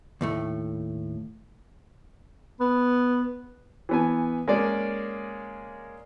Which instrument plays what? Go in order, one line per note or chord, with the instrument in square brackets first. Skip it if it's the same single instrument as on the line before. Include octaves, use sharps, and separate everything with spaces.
[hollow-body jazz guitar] D#2 A2 A3
[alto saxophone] B3
[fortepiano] E3 B3 G#5
G#3 A#3 C#4 D5